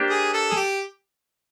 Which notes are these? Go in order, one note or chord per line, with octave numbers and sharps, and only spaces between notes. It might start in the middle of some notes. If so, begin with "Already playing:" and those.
Already playing: A#3 D4 G4 C5
G#4
A4
G#4
G4